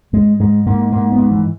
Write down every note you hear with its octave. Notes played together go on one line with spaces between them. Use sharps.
G#2 G#3
G#2 G#3
G#2 A#3
G#2 A#3
B3
G#2
E3